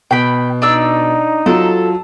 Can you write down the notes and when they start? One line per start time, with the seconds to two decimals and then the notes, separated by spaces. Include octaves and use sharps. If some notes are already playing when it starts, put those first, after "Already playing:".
0.11 B2 G5 B5
0.62 D4 D#4 D5 E6
1.46 F#3 F4 A4